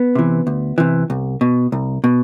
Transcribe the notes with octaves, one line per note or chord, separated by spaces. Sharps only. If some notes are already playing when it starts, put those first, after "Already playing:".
Already playing: B3
C3 E3
D2
C3 E3
C2
B2
C2
B2